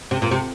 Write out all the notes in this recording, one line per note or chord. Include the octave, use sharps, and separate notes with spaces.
C3
A#2
C3